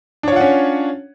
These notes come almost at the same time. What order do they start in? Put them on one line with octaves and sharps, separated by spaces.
D4 C#5 F4 F#5 C#4